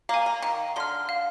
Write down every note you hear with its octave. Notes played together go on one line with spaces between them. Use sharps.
A#3 F5 G#5
A#3
D#3 F5
D3 C6 F6
F5